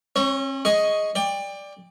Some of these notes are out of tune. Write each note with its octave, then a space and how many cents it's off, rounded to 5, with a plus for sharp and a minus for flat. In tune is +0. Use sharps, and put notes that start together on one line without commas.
C#4 -45 C#5 +0
G#4 +0 D#5 +10 C#6 +0
D5 +0 G5 +30